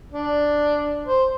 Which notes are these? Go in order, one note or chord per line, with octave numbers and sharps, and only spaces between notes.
D4
C5